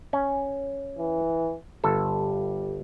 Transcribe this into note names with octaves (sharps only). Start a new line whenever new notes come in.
C#4
E3
G1 G3 A4